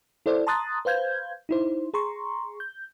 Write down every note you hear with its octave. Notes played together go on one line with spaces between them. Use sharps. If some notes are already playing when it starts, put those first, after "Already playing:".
E4 A4 C5 D5
A5 A#5 C6 D#6 F#6 A6
B4 C5 F5 G6 G#6
D#4 E4 C5
G#4 A#5 C6 C#6
G6